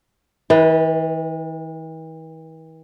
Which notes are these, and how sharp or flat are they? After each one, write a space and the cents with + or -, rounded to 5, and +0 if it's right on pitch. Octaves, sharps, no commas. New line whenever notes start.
E3 -45 B4 +5